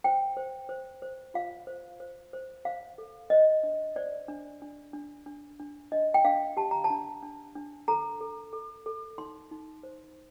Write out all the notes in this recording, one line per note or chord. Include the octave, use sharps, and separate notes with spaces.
C5 G5
C5
C5
C5
F4 F5
C5
C5
C5
C5 F5
A4
C5 D#5
D4
C5 D5
D4
D4
D4
D4
D4
D4 D#5
G5
D4 F5
G4 A5
A#5
A5
D4
D4
D4
A4 A#5
A4
A4
A4
D#4 C6
D#4
C5